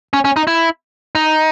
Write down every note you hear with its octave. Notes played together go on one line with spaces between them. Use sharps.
C#4
C#4
D#4
E4
D#4